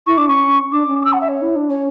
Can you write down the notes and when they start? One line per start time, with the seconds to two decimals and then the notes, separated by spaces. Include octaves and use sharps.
0.06 E4 C#6
0.17 D4 D6
0.28 C#4 C#6
0.72 D4 D6
0.88 C#4
1.01 D6
1.04 E6
1.12 F#5
1.21 E5
1.28 C#5
1.42 E4
1.56 D4
1.69 C#4 C#5